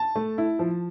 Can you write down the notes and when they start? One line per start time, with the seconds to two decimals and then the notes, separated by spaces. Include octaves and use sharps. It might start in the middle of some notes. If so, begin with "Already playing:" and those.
Already playing: A5
0.16 A3
0.38 E4
0.59 F3